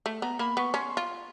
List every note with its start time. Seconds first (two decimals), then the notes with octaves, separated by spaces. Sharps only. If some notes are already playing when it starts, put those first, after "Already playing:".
0.06 A3
0.22 B3 A#5
0.39 A#3 B5
0.57 B3 C#6
0.74 C#4 C6
0.81 C#6
0.89 C6
0.97 F4